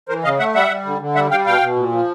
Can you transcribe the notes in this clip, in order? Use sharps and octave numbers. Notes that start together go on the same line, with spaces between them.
E3 A#4 C5
C#3 D#5 F5
A3 E5 F#5
G3 E5 F#5
G3
D3
D3
G3 E5 F#5
G3 F5 G5
B2 F5 G5
B2
A#2
F3